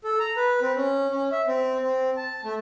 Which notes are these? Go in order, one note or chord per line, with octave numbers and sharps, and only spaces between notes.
A4
A#5
B4
C4
C#4
C#4
E5
C4
C4
A5
A3